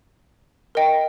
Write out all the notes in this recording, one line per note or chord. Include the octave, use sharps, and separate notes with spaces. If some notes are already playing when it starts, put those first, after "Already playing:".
A#4 D#5 G5